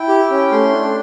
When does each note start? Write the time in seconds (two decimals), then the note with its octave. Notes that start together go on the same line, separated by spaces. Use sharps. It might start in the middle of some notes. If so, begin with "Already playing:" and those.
Already playing: E4 G5
0.08 G4
0.30 C#4
0.51 A3 C6
0.73 D4